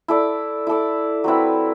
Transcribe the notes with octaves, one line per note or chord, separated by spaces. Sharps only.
E4 A4 D5
E4 A4 D5
F#3 C4 E4 B4